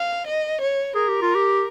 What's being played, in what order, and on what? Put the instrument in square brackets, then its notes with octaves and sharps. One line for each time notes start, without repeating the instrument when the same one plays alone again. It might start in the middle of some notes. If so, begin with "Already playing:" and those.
Already playing: [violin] F5
D#5
C#5
[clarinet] G#4 [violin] A#4
[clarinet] G4
F4
G4